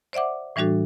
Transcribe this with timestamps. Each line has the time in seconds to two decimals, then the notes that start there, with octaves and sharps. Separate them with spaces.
0.13 C5 D5 E5 F#5 D6
0.56 A2 E3 G3 D4 F#4 A4